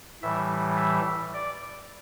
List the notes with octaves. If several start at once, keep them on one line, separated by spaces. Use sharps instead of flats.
A2 E3 G3 E5
E5
D5